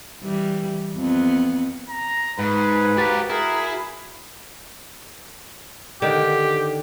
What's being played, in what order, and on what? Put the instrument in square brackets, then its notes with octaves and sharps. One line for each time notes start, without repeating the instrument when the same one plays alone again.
[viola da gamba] E3 G3
F2 B3
[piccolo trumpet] A#5
[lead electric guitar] G#2 [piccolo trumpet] G#4 [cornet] B4
[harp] F#4 A6 B6 [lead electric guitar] G4 A#4
[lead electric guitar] E4 [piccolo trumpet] G#4 [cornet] A#4
[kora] D3 D#3 [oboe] G4